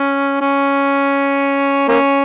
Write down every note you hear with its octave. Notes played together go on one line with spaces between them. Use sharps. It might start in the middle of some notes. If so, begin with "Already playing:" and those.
Already playing: C#4
C#4
A#3 C#4